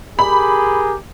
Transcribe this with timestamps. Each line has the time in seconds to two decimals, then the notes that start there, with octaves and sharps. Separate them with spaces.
0.19 G4 G#4 A#4 B5